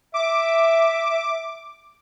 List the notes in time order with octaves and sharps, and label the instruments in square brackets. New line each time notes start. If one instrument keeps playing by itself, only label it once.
[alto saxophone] E5 [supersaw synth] D6